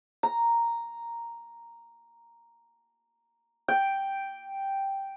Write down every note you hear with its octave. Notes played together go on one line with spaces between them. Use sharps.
A#5
G5